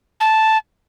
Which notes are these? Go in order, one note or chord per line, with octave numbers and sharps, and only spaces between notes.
A5